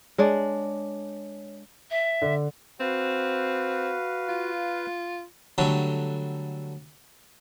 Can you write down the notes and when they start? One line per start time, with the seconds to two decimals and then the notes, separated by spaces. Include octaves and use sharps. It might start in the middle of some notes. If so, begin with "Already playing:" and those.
0.18 G#3 D4 C#5 D5
1.90 E5
2.22 D3
2.80 C4 F#4 B4 F5
4.29 F4
5.58 D3 F#3 G3 A3 F#4